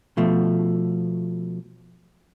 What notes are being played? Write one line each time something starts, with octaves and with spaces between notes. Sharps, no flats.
B2 F3 A3